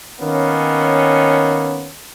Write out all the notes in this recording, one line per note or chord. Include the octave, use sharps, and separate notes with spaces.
D#3 A#3 B3 C#4